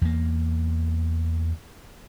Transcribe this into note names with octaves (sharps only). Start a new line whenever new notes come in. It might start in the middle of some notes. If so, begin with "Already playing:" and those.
E2 A#3